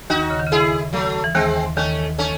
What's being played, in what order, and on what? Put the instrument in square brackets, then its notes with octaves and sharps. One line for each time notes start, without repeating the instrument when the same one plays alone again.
[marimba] D#2 D#3 [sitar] D#4 F#4
[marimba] C#3
D#3
C#3
[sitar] E4 G#4
F#3 A3
[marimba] E3
[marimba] D#2 D#3 [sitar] G#3 C4
[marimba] D#2 D#3 [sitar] A3 C#4
[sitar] A3 C#4